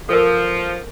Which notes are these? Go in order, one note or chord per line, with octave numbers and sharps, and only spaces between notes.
F3 A4 A#4